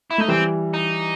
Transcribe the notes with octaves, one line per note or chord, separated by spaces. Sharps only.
E4
A3 D#4
E3 G3 C4
D#4